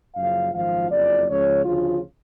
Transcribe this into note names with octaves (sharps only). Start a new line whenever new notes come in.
F#1 F#2 C#3 F3 F5
G#1 F#2 F3 F5
F#1 F2 C#3 F3 D5
C#2 C#3 F3 C#5
D2 C#3 F3 F4